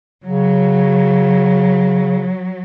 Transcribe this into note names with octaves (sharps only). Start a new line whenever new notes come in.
C#3 F#3